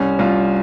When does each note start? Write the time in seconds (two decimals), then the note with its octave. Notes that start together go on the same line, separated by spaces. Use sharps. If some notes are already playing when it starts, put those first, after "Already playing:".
Already playing: C2 C#4
0.19 C2 F4